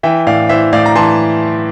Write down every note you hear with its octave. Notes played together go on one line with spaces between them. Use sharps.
E3 E5 G5
A2 D5 F5
E3 C5 E5
A2 D5 F5
A#5
E3 A5 C6